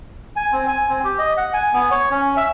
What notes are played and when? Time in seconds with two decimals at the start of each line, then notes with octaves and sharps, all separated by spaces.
0.36 G#5
0.52 C4
0.68 G#5
0.89 C4
1.04 G4
1.19 D#5
1.37 F#5
1.53 G#5
1.73 B3
1.91 C#5
2.11 C#4
2.37 E5